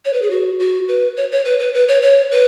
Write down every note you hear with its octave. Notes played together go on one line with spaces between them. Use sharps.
C#5
B4
G#4
F#4
F#4
B4
C#5
C#5
B4
B4
B4
C#5
C#5
B4